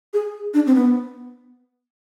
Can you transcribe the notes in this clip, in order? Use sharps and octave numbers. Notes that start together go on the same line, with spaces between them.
G#4
D4
C4
B3